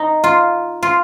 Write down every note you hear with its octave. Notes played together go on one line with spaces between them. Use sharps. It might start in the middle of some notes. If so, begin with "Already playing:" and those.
Already playing: D#4
F4
F4